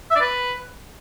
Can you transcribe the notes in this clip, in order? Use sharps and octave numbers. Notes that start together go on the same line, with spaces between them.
E5
D5
B4